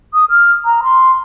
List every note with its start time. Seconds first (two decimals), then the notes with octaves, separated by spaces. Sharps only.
0.14 D#6
0.30 F6
0.65 A#5
0.83 C6